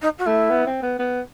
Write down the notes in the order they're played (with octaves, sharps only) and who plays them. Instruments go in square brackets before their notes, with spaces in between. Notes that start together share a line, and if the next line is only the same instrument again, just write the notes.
[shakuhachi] D#4
F#4
[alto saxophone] A3 [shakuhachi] E4
[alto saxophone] B3
C4
B3
B3